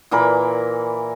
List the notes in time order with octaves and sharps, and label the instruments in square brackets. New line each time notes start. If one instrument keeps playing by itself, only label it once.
[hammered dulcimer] A#2 E3 A#4 B5